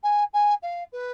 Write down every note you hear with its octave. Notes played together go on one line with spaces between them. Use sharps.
G#5
G#5
F5
B4